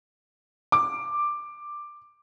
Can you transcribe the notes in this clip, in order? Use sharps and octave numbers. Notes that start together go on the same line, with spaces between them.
D6